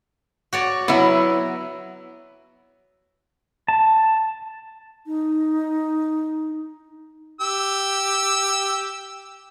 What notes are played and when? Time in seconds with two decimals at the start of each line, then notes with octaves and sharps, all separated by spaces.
0.53 F#4 C#5 D5
0.88 F#3 B3 E4
3.68 A5
5.06 D#4
7.41 G4 E6